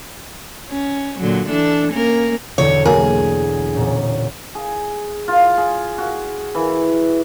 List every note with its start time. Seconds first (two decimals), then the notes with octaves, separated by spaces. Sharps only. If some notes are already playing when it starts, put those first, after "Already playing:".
0.69 C#4
1.20 A#2 D3 F#3
1.49 E3 D4 A4
1.92 A#3 C#4 A#4
2.58 B1 E2 D3 C#5
2.85 F#3 A#3 G#4 A#4
3.75 E1 A#2 C#4
4.55 G#4
5.28 F4
5.58 G#4
5.98 F#4
6.55 E3